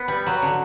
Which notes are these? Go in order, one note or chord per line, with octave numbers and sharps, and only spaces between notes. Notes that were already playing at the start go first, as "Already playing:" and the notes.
Already playing: B3
G3
F#3
D3